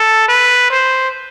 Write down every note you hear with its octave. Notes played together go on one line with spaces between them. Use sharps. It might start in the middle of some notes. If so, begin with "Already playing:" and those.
Already playing: A4
B4
C5